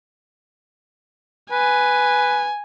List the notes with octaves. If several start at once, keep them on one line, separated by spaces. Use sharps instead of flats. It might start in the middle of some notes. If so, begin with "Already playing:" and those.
B4 G#5